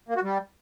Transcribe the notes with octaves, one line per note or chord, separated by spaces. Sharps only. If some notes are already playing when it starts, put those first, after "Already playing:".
A#3
F#4
G3